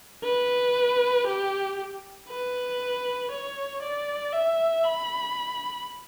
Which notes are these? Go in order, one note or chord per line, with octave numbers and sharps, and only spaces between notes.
B4
G4
B4
C#5
D5
E5
B5